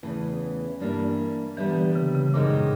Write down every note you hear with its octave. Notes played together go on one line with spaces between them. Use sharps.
E2 C#3 E3 A3
G2 E3 G3 A#3 D4
A#2 E3 G3 B3 D4
D3
C#3
C#3
F#2 A#2 D#3 G#3 C4 D#4
A2